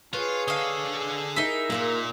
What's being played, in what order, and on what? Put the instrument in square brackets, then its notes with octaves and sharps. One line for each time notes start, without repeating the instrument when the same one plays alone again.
[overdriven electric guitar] F4 [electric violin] G#4 C#5 [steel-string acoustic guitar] B4 A5
[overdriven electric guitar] D3 A4 [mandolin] D#5 F5
[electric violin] G#4
[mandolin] D#4 E5 [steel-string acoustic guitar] E4 G4 A#4
[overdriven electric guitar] A#2 [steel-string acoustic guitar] A#3 F4 A#4